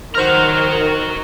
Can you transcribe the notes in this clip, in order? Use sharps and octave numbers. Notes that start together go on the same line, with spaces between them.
D#3 F#4 C5 A#5 F6